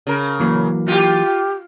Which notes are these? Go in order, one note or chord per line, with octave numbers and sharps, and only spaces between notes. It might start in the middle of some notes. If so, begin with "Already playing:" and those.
C#3 A#4
E3 F#3 A#3
F4 G4